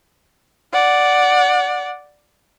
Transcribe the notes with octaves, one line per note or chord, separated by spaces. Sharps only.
D5 F#5